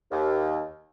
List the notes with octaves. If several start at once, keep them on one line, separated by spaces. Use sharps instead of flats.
D#2